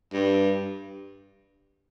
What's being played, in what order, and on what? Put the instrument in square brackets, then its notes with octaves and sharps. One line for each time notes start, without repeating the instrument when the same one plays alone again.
[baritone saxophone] G2